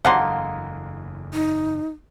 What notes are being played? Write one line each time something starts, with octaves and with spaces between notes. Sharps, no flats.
F#1 E2 D3 G#3 A#3 F5 F#5 C6
D#4